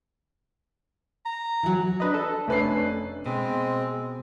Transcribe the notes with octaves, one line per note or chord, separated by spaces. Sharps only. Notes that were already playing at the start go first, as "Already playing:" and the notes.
A#5
E3 F#3
D4 B4 D#5
A4
F1 A3 C#4 D4 B4 C7
B2 G#3 C4